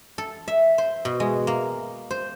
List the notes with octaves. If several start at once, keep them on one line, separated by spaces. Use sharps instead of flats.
A4
E5
C5
B2
G#3
A#3
C5